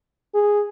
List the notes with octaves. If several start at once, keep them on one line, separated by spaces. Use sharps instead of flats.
G#4